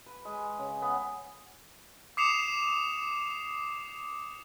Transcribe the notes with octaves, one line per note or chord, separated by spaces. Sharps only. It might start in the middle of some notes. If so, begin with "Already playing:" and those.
B4
G#3
C#3
B3
D6 D#6 C7 C#7 E7 F7